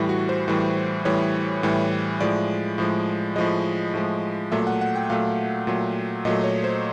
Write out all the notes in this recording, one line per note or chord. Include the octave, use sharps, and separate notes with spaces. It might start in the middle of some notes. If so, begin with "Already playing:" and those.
Already playing: A2 E3 G3
F#4
C5
A2 E3 G3
A2 E3 G3 C#5
A2 E3 G3
A2 F3 G#3 D5
A2 F3 G#3
A2 F3 G#3 D#5
A2 F3 G#3
A#2 F#3 A3 E5
F#5
F#5
G5
A#2 F#3 A3 F5
A#2 F#3 A3
A#2 F#3 A3 D#5
C#5
C5